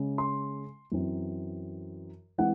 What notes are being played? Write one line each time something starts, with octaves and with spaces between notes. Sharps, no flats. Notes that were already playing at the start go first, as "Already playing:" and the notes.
Already playing: C#3 G#3 C#4
C6
F#2 E3 C4
E3 G#3 C4 F#5